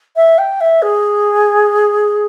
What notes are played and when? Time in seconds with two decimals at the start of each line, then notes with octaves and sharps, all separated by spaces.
0.16 E5
0.38 G5
0.60 E5
0.82 G#4